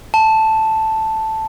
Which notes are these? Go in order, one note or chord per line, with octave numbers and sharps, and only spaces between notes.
A5